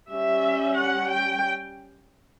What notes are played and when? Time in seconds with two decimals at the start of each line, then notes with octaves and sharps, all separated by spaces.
0.11 G3 C#4 E5
0.77 F#5
1.11 G5